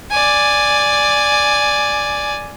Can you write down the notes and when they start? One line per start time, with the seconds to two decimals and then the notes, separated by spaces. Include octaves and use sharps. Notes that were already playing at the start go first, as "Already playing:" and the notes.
0.11 D5 G#5